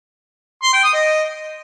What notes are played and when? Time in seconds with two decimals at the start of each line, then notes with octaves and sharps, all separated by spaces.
0.63 C6
0.73 G5
0.83 D#6
0.94 D#5